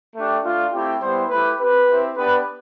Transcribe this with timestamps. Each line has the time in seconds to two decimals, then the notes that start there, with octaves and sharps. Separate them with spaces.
0.15 A3 D4 G4
0.44 A3 D4 F4
0.73 A3 C4 E4 G4
1.01 G3 B3 E4 G4 C5
1.30 A3 E4 G4 B4
1.59 C4 G4 B4
1.88 C4 E4 G4
2.16 B3 D4 G4 B4